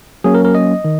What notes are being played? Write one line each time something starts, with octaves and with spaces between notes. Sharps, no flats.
F#3 A#3 C#4 G#4
A#4
A#4
D#5
D#3